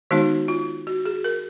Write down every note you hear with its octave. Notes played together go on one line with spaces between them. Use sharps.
D#3 G#3 B3 D#4 F#4
F4
F#4
G#4
A#4